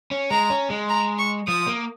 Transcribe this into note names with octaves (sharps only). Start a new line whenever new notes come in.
C#4
G#3 A#5
C#4
G#3
A#5
C#6
F3 D#6
A#3